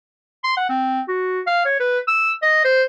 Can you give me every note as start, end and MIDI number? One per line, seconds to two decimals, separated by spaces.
0.44 0.54 84
0.57 0.64 78
0.69 1.01 60
1.08 1.41 66
1.47 1.63 77
1.65 1.79 73
1.80 1.99 71
2.08 2.32 88
2.42 2.60 75
2.65 2.85 72